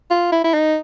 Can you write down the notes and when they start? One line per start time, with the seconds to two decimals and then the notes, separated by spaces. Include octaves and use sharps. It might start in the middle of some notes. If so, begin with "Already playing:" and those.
0.11 F4
0.32 E4
0.44 E4
0.54 D#4